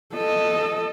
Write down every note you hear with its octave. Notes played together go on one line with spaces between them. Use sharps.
A4 D#5